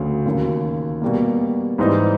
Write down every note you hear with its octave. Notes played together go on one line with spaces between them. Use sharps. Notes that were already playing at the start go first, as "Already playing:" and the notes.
Already playing: D2 C#3 F#3
D#2 C#3 F#3
B2 G3 A#3
G#2 E3 G3 C4 D#4